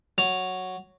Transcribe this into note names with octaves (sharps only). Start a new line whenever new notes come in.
F#3 F7